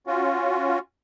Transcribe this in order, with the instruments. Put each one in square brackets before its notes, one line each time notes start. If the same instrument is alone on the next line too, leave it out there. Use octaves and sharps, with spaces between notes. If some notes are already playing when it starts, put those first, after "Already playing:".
[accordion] C#4 F4 F#4